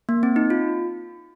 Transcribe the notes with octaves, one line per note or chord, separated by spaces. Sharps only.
A#3
C4
D#4
F4